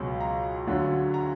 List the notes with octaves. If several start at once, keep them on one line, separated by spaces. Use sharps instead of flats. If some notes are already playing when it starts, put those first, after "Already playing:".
Already playing: C#2 B2 F#3
A#5
D2 D3 F#3
A#5